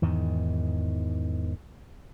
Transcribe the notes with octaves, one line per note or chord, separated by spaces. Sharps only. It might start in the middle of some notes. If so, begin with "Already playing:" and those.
E2 G#2 D#3